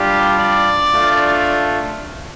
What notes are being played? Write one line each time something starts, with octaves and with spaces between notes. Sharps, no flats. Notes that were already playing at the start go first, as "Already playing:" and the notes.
Already playing: G3 D4 F4 G4
D5
A3 D4 F4